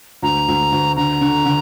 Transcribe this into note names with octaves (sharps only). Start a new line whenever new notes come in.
D2 A#5
D2
D2
D3 A#5
D3
D3